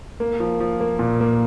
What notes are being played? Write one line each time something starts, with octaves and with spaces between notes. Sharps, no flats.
A#3
F3
F3
A#3
A#2
A#3